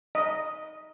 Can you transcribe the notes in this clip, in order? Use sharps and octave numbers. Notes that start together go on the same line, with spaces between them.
D#5